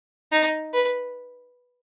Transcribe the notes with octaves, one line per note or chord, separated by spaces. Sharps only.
D#4
B4